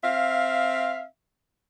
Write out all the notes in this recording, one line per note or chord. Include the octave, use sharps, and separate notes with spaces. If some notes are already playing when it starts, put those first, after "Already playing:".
C4 E5 F5